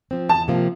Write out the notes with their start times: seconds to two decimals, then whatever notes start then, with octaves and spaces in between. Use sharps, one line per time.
0.11 F3 C4
0.29 E2 A5
0.48 C3 F3 A#3 F4